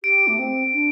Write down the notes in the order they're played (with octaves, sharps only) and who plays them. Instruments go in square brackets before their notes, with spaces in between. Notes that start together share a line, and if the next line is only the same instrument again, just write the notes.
[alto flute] G4 [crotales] D7
[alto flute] A3
C4
D4